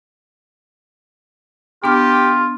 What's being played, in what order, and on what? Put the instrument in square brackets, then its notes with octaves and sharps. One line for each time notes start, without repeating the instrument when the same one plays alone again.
[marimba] B3 D4 F6 [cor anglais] F4 [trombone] G4